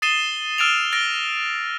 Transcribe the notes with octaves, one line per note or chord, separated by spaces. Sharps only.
D#6 A6 C7 D#7 E7 G7
E6 F6 A6 D7 E7 F7
E6 F6 A6 A#6 D7 G7